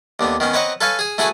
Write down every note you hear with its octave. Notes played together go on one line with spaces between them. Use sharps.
D#2 D3 B3
D#3 B3 C#4
C4 B4 C#5 D#5 F#5 A#5
A4 B4 C#5 F5 G#5 A5
G#4 G#5
A3 E4 F#4 G#4 B4 G#5